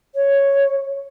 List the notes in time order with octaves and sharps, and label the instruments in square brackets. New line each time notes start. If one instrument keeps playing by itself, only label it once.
[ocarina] C#5